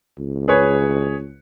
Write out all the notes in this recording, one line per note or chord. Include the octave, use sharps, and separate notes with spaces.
C#2
G#4 B4 C#5